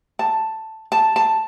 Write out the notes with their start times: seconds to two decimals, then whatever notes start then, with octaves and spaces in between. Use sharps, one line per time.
0.19 A5
0.92 A5
1.16 A5